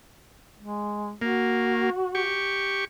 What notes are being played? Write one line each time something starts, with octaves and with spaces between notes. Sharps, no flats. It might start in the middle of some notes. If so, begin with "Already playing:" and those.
G#3
A#3 F#4
G4 C#6